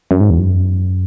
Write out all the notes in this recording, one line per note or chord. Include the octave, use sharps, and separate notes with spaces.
F#2
G#2
E2
F#2